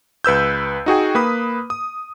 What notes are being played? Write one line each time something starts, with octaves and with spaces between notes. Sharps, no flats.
C#2 B4 E6 G6
D#4 F#4 G#4 G5
A#3 B4 B5 D#6
D#6